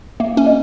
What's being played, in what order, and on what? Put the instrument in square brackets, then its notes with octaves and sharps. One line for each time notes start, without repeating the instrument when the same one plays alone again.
[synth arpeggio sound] A#3 [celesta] E5
[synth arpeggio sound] C#4
[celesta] D#5